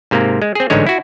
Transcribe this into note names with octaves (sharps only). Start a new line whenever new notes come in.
G#2 C3 A#3
G#3
C4 G#4
A1 G#2 D3 G#3 C#5
E4 F#4